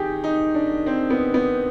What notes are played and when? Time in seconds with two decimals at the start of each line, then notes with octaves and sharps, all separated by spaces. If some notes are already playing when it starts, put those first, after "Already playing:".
Already playing: D#3 G4 G#4
0.24 D#4
0.55 D4
0.86 C4
1.10 B3
1.34 B3